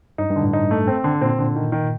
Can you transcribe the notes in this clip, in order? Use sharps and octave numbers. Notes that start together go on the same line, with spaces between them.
G2 D#4
G2
D3
A2
D#4
A3
C4
D3
A#2 C4
D3
D#3
D#3